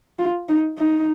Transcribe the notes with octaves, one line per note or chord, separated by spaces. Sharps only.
F4
D#4
D#4